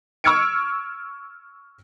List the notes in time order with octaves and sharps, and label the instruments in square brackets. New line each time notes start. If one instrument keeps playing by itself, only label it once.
[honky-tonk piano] C#6 E6 F6 G#6 C#7 D7